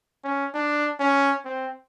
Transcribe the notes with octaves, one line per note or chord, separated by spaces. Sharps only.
C#4
D4
C#4
C4